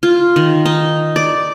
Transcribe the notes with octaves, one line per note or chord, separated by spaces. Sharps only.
F4
D#3
D#4
D5